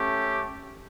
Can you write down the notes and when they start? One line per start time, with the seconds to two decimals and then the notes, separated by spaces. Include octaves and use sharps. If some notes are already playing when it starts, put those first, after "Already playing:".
Already playing: A3 C#4 G4